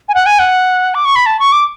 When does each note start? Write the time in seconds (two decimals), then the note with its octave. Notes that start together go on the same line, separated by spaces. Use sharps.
0.09 G#5
0.15 F#5
0.26 G#5
0.39 F#5
0.95 D6
1.05 C#6
1.16 B5
1.26 A5
1.40 C#6
1.52 D6